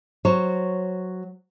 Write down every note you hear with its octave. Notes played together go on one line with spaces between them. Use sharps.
F#3 C5 C#5